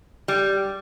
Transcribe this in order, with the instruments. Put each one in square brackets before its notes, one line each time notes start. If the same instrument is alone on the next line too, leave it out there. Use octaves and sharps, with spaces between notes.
[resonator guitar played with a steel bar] G3